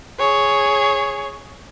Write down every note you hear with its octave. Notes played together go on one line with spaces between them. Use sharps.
G#4 C#5